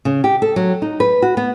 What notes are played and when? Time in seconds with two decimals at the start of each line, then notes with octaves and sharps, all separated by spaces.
0.05 C#3
0.24 G4
0.42 A4
0.56 F#3
0.82 D#4
1.00 B4
1.22 F#4
1.37 B3